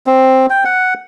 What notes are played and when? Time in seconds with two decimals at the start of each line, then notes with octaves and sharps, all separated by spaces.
0.07 C4
0.50 G5
0.65 F#5